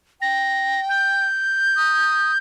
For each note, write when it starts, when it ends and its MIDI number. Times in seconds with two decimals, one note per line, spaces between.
0.21 1.25 79
0.21 0.80 94
0.89 2.37 91
1.77 2.32 87